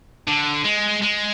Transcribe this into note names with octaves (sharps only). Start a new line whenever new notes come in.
D3
G#3
G#3